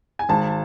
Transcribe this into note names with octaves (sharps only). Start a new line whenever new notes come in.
G#5
G#1 A5